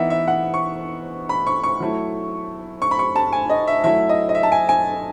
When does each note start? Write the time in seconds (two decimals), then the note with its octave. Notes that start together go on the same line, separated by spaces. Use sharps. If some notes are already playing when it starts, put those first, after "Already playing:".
Already playing: E3 B3 D#4 E5 F#5
0.10 E5
0.28 F#5
0.54 C#6
1.29 B5
1.47 C#6
1.64 C#6
1.80 F#3 A3 E4
2.82 C#6
2.91 B5
2.99 C#6
3.16 A5
3.33 G#5
3.50 D#5
3.67 E5
3.84 F#3 A3 E4 E5
4.09 D#5
4.29 D#5
4.35 E5
4.43 A5
4.52 G#5
4.69 G#5